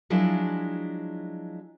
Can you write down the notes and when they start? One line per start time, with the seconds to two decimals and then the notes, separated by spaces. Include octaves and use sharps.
0.10 F3 F#3 G#3 D4 E4